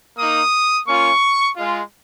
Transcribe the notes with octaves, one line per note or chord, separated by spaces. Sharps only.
A#3 D#4 D#6
A#3 C#4 F4 C#6
G#3 F4